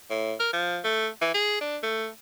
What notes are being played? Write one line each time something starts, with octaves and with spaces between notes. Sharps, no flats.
A2
A#4
F3
A3
E3
G#4
D4
A3